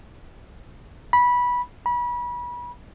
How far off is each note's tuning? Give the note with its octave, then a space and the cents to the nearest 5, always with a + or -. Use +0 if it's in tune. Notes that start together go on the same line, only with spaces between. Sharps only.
B5 -15
B5 -30